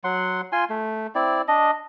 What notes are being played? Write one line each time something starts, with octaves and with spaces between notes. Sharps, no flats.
F#3 F#5 C6
F4 G#5 C6
A3
C4 E4 D5
D4 D#5